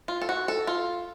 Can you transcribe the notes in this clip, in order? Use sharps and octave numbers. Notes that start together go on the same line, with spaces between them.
F4
A4
F#4
A4
F4